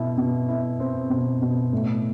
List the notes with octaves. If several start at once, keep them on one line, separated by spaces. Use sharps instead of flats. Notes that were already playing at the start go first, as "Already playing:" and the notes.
Already playing: B2 E4
B2
E4
C4
B2
B2
A2